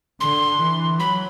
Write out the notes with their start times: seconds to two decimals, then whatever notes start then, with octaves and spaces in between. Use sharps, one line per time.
0.21 D3 C6
0.61 E3
1.00 F#3 B5